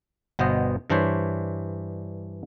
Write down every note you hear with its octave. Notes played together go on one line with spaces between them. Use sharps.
G1 B2 B3 C5 D#5
G2 E3 D4 C5 C#5